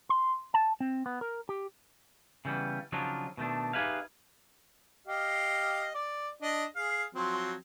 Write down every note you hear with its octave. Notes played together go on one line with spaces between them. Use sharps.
C6
A5
C4
B3
A#4
G4
C#3 E3 G3 B3
C#3 F3 F#3 D4 D#4 F4
B2 D#3 A3 D4
D#4 G4 G#4 B4 E5 F5
G4 D#5 F5
D5
D4 D#5
G#4 F5
F3 F#3 C4